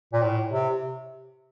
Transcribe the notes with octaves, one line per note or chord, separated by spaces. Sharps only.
A#2
A2
C3